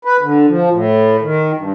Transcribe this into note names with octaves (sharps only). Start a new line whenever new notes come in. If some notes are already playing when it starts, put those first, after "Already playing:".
B4
D3
F3
A2
D#3
G2